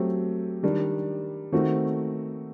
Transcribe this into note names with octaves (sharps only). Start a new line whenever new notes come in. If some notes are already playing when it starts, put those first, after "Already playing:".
Already playing: F#3 A3 C4 G4
D#3 G3 D4
D#3 A3 C4 F#4